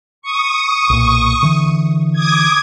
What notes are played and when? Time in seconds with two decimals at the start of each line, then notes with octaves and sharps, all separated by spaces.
0.22 C#6 D#6
0.90 B1 A#2
1.42 D3 E3
2.13 D6 D#6 G#6